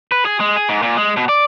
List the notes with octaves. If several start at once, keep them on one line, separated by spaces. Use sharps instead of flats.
B4
G#4
G#3
G#4
G#2
A#2
G#3
B2
D5